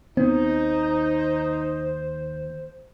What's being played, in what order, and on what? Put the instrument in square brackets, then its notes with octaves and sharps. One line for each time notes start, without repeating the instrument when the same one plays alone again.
[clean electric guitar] D#2 G#2 D#3 [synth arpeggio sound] B3 C4 [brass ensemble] D#4 [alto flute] C5